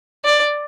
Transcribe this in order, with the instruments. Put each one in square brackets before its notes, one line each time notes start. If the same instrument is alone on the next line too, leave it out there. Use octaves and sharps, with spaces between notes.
[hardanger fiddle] D5